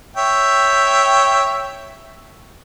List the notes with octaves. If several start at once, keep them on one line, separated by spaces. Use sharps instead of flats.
C#5 E5 G5